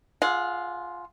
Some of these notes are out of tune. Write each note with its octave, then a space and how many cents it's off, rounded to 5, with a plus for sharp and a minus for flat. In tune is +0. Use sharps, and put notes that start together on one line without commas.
F4 +0 G#4 +20 F#5 -25